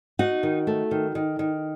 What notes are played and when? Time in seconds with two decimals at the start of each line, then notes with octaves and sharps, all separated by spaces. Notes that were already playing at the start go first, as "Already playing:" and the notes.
0.19 D#4 F#4 F#5
0.43 D#3
0.67 A3
0.91 D#3
1.15 D#3
1.39 D#3